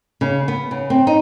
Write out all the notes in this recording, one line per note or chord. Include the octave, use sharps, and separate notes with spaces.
C#3
B3
C#3
C4
D#4